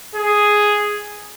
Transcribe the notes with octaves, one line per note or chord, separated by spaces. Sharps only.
G#4